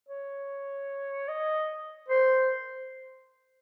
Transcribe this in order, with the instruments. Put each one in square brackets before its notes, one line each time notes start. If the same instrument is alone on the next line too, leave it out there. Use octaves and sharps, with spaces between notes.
[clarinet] C#5
D#5
C5